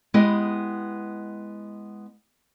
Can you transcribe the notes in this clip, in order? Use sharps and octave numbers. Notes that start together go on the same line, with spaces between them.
G#3 B3 E4 G4 D#5